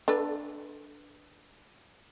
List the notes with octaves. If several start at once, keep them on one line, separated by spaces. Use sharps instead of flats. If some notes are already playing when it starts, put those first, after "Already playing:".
D4 A4 B4